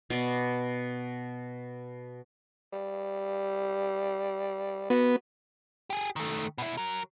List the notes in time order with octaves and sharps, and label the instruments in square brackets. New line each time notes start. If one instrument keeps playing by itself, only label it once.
[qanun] B2 D5
[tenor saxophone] G3
[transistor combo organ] B3 [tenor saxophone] F#4
[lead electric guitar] G4 G#4
D#3 A3
B2 E4
F#3 A#4